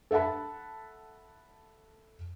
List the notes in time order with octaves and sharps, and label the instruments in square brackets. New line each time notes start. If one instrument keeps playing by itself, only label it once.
[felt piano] A4 E5 F#5 A5 B5